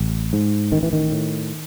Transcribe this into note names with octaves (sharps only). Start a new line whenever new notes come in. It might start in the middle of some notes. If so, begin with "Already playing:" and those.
Already playing: A1
G#2
A1 D#3
E3
D#3
A2